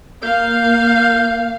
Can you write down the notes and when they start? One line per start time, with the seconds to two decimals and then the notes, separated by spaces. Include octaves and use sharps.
0.22 A#3 F5 G6